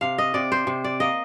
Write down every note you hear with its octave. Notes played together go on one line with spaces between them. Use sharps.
C3 F5
D#5
C3 D5
C5
C3
D5
A#3 D#5